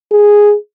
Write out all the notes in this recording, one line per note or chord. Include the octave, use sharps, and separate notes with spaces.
G#4